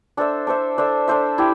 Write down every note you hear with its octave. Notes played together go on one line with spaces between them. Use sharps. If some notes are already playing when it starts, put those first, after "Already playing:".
D4 A4 C5 E5
D4 A4 C5 E5
D4 A4 C5 E5
D4 A4 C5 E5
E4 G4